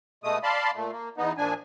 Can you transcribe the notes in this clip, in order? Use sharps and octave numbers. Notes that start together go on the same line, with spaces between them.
B2 G#3 A3 D#6
D5 F5 A5 B5 C6
A#2 A3
A#3
E2 B3 D#4
A#2 F3 D4 G#5